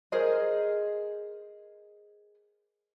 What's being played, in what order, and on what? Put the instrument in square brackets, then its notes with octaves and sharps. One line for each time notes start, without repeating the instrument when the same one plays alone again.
[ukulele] G#4 A#4 C5 D#5